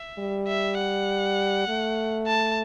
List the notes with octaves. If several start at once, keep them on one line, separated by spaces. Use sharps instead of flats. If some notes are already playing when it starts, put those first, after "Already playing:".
Already playing: E5
G3
E5
F#5
A3
A5